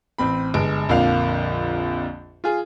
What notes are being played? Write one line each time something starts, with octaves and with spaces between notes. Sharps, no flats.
A1 C4 B5
G1 G#3 D7
A#1 F2 D3 A#3 F5 F7
F4 G#4